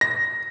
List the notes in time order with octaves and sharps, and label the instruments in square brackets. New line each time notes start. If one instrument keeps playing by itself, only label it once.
[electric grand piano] A#6